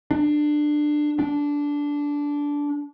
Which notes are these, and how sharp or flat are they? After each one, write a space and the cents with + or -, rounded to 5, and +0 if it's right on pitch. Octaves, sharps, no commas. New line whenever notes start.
D4 +20
D4 -15